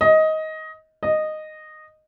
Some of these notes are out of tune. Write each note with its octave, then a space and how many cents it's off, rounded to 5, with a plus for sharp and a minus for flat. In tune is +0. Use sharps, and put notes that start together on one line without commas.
D#5 +15
D#5 -10